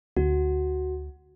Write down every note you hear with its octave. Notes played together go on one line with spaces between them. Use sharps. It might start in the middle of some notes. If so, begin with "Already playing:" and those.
D2 F#4